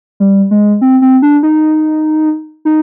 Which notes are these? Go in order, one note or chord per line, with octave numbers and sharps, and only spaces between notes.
G3
G#3
C4
C4
D4
D#4
D#4